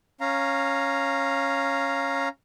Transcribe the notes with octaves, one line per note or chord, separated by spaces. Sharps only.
C#4 F5 A#5